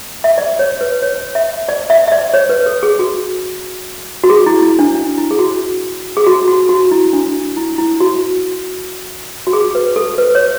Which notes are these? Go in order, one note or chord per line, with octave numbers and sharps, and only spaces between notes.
E5
D5
C#5
B4
C#5
E5
D5
E5
E5
D5
C#5
B4
A4
G#4
F#4
F#4
G#4
E4
E4
D4
D4
E4
G#4
F#4
G#4
F#4
F#4
F#4
E4
D4
E4
E4
F#4
F#4
G#4
B4
A4
B4
C#5